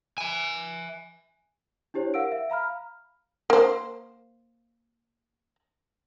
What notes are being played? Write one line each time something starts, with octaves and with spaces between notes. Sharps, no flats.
E5 G#5
D4 E4 G4 C5 C#5
A#4 F5 F#5 E6 D7
E5
F5 A#5 B5 F6
A#3 C5